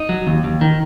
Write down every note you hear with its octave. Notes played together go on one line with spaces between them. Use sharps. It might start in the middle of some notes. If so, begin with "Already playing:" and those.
Already playing: D#4
F#3
D#2
D#2
D#3